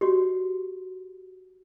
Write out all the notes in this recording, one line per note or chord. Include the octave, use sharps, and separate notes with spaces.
F#4 G4